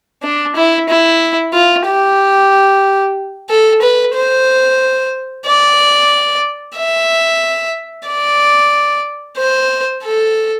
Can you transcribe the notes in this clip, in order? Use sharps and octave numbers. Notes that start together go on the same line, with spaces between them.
D4
E4
E4
F4
G4
A4
B4
C5
D5
E5
D5
C5
A4